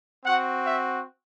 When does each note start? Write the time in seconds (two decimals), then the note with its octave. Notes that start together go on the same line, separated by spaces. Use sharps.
0.23 C4 F#4 F#5
0.63 E5